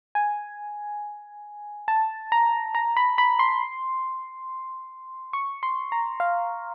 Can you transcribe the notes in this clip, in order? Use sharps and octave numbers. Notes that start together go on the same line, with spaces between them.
G#5
A5
A#5
A#5
B5
B5
C6
C#6
C6
A#5
F5